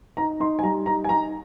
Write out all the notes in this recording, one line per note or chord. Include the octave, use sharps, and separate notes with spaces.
D#4 A#5
D#4 C6
G#5
G3 A#5
D#4 A#5
G#5
D#4 A#5